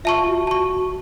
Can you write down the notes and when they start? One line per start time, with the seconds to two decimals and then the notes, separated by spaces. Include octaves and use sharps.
0.05 F4 E5 A5 C#6
0.28 F#4
0.47 A5 C#6